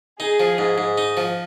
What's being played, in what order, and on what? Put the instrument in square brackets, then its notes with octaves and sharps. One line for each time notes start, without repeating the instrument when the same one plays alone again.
[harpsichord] D#4 [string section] G#4
[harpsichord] F3
G#2
G#2
D#4
F3